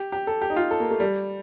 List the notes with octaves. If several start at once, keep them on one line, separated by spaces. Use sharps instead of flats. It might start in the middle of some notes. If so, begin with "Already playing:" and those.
Already playing: G4
G4
A4
G4
D#4
F4
A4
A#3
A3
G3